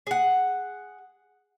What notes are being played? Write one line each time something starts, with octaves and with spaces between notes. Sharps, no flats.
G#4 F#5